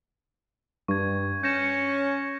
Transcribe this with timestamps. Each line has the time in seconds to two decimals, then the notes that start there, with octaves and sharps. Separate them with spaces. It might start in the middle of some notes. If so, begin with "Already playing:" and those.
0.88 G2 C#6 G#6
1.43 C#4 G6 A#6 C#7 E7